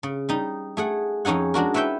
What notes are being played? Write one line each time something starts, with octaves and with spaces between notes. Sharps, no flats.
C#3
G3 D#4
A3 G#4 F#5
F2 C#4 D#4 G#4 F#5
G#3 D4 F#4 A#4
E4 B4 C#5 E5 G5